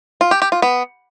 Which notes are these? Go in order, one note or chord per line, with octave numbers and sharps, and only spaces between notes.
F4
G4
G4
F4
B3